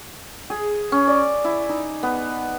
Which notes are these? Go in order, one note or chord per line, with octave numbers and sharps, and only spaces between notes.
G#4
C#4
D5
E4
D#4
B3